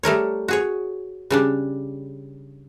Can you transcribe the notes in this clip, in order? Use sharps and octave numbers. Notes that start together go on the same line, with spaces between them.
G3 A3 A#4 C#5
F#4 G#4 C#5
C#3 G3 D4